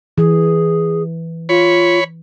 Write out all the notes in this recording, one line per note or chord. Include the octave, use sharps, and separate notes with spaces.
E3 G#4
F4 C#5 B5